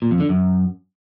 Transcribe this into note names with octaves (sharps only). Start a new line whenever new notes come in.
A#2
F2
D3
F#2